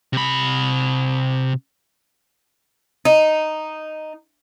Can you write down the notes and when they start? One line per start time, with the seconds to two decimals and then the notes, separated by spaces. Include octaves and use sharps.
0.13 C3 B5
3.05 D#4